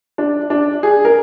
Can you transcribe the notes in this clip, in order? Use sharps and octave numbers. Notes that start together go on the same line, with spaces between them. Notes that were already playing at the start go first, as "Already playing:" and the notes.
D4
D4
G#4
A#4